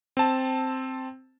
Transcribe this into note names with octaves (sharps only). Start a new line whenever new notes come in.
C4 A5